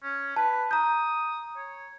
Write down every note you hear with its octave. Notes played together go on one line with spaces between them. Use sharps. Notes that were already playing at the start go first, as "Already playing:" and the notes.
C#4
B4 A5
A#5 D#6 G6
C#5